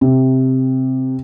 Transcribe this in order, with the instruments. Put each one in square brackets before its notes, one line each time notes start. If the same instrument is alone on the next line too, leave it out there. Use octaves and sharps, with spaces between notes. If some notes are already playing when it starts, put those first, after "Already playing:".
[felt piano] C3